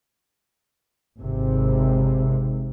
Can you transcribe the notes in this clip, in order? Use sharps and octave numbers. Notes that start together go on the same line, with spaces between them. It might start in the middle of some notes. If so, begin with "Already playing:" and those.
G#1 C3